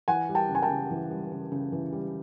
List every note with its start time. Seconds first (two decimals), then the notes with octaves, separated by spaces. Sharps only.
0.08 E3 F#5 G#5
0.29 G3
0.35 G5 A5
0.49 C#3
0.55 G#5
0.62 G5 A5
0.69 C#3
0.91 E3
1.11 G3
1.31 C#3
1.52 C#3
1.72 E3
1.92 G3